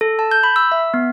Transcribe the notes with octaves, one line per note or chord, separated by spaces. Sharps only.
A4
A5
G6
B5
E6
E5
B3